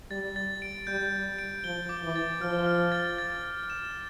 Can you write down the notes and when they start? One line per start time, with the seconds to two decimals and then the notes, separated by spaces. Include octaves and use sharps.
0.11 G3 A6
0.36 A6
0.62 D7
0.87 G3 G6
1.13 G6
1.39 D7
1.64 F3 G7
1.89 D6
2.03 E3
2.16 A6
2.41 F3 F6
2.66 F6
2.92 A6
3.18 A6
3.43 A6
3.70 E7